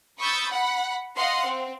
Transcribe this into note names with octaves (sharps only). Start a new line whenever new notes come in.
B5 C#6 D#6 E6 G6 A6
F#5 B5
D#5 F5 F#5 C6
C4